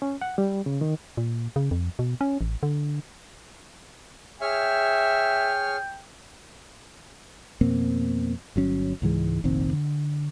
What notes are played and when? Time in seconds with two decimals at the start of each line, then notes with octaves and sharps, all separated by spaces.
0.02 C#4
0.21 F#5
0.38 G3
0.66 C#3
0.81 D#3
1.17 A#2
1.56 C#3
1.71 F2
1.99 B2
2.21 C#4
2.41 A1
2.63 D3
4.41 G#4 C#5 E5 G5 F6
7.61 F2 B2 A#3 C4
8.56 G1 F#3 C#4
9.02 C#2 G#2 E3 G#3
9.44 F1 A#1 D#3 C4
9.73 D3